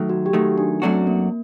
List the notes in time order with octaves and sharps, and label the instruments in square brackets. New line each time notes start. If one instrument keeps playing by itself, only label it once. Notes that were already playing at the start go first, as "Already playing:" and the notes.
Already playing: [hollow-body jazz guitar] D#3 F#3 A3
[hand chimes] F#4
G4
[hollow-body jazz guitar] D#3 F#3 A3 [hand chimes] F#4
[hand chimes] D4
[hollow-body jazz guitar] F#2 F#3 A3 D4 F#4 [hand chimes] C4
[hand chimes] A#3